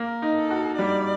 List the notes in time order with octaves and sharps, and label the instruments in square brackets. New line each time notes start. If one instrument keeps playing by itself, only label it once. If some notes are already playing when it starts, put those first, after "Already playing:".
Already playing: [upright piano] A#3 [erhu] A#4
[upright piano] D#4
[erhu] A4
[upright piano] F#4
[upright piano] G3 [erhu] D5